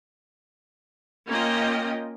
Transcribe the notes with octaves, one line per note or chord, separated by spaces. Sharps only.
A#3 C#4 F4 D#5 G5